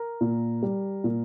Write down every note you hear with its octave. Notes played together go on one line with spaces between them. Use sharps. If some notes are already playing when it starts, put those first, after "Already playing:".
Already playing: A#4
A#2
G3
A#2